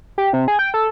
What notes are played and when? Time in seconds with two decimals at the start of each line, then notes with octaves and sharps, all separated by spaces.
0.18 G4
0.33 C3
0.48 G#4
0.59 G5
0.74 A4